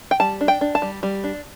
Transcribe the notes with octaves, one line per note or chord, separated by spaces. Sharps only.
G5
G3 A5
D4
G5
D4
A5
G3
G3
D4